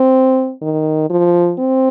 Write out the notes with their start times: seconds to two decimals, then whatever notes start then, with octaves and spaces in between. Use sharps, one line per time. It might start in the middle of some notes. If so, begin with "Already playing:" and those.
Already playing: C4
0.62 D#3
1.10 F3
1.59 C4